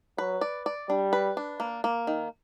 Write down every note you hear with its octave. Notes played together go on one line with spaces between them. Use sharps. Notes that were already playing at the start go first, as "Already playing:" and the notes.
F#3 B4
D5
D5
G3 D4
B4
D4
A#3
A#3
D#3